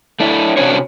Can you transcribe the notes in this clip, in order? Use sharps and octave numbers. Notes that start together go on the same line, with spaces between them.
A3 D4 E4
C3 C#4 D4 F#4 C5 C#5